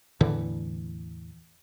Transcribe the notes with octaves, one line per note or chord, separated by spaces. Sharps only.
E2 A2 D3 E3